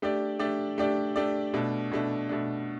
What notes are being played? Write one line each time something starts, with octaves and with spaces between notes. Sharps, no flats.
A3 D4 G4 D5
A3 D4 G4 D5
A3 D4 G4 D5
A3 D4 G4 D5
B2 A3 D4
B2 A3 D4
B2 A3 D4